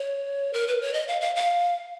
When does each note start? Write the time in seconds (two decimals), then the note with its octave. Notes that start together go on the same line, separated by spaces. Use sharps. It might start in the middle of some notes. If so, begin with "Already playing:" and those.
Already playing: C#5
0.53 A#4
0.68 B4
0.81 C#5
0.93 D#5
1.08 F5
1.21 F5
1.36 F5